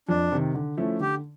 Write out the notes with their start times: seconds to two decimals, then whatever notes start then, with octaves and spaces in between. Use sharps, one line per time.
0.09 F2 D4
0.32 C3 D#3
0.55 D3
0.77 F3 A3 C#4 E4
1.00 D3 G4